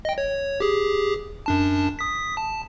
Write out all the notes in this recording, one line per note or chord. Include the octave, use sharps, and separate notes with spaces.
D#5 G5
C#5
G4 G#4
F#2 D4 A5
D#6 B6
A5